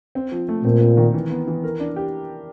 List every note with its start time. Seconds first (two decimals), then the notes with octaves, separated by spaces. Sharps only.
0.15 C4
0.32 F3
0.48 A3
0.64 A#2 C4
0.81 C4
0.97 D#3
1.14 E3
1.30 B3
1.48 E3
1.64 A#4
1.80 D4
1.96 G4